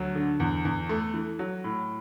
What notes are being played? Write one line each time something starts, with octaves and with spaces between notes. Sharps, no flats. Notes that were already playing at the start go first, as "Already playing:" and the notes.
Already playing: D2 F#3
D3
E2
E2
A3
E3
F#3
A2